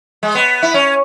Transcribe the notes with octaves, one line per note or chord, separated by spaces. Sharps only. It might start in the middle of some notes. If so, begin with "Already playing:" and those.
G#3
B3
E4
C#4